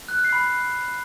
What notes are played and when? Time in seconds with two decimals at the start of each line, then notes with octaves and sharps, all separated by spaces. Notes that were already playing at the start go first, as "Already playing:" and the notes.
0.08 F#6
0.16 F6
0.24 C7
0.32 B5